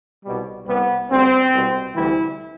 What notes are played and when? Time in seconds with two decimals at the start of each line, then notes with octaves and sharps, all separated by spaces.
0.24 C2 B2 G3
0.67 C2 C3 G3 B3
1.10 D2 D3 G3 C4
1.52 C2 B2 G3
1.95 D2 C3 E3 G3 E4